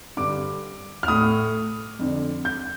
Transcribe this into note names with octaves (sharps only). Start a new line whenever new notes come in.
G2 D3 D6
F6
A2 D#6
F2 D3
G6